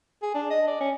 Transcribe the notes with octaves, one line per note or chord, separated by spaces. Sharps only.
G#4
D4
D#5
D5
C#4